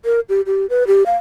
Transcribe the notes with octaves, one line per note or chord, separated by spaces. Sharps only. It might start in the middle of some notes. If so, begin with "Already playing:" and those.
A#4
G4
G4
B4
G4
F5